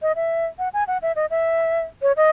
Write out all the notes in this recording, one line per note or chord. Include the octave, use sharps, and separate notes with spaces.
D#5
E5
F#5
G#5
F#5
E5
D#5
E5
C#5
D#5